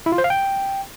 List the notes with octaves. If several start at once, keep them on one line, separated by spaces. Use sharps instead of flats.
E4
F4
C5
F5
G5